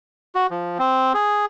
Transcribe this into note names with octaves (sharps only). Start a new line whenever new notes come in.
F#4
F3
C4
G#4